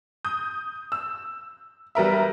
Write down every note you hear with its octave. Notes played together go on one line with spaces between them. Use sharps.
D#6 G6
E6
G3 B3 A#4 E5